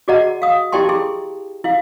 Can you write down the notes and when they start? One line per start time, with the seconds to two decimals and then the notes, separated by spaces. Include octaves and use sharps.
0.08 F#4 G#4 D5 D#5 F#5 A#5
0.42 F5 D#6
0.72 E4 G4 D5 G5 A5 C6
0.89 E4 G#4 C6
1.64 E4 F5